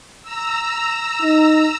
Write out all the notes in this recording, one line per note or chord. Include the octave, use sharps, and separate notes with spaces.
A#5 E6
D#4